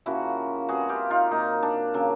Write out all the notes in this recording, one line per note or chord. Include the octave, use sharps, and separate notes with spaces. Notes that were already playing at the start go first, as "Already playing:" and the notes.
C#3 F3 A#3 C#4 E4 F#4
E3 G3 C4 F#4 G#4
F4 G4
D#4 F4
A#2 F#3 A#3 D#4
D4
C#3 F#3 A#3